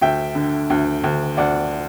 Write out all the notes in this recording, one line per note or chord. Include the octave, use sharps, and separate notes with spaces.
D2 E5 G5
D3
D2
D2
D2 D5 F#5